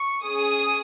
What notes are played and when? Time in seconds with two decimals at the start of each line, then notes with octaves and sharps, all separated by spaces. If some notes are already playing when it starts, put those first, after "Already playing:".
Already playing: C#6
0.24 C#4 G#4 D#6